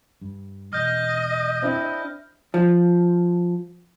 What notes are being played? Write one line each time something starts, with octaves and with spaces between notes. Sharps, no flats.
G2
E1 D#5 F6 G6
C4 D4 E4
F3